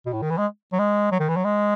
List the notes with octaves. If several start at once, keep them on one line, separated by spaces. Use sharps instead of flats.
B2
A2
D#3
E3
G#3
F#3
G#3
F#3
D#3
E3
F#3
G#3